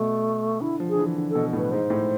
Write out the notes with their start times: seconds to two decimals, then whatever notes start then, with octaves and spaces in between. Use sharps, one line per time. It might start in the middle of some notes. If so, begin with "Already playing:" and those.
Already playing: B2 A3
0.61 D3 E4
0.80 F3
0.90 G#4
0.95 D3
0.99 E3
1.17 D3
1.30 B2 A4
1.53 A2 B4
1.71 G#2 C5
1.90 A2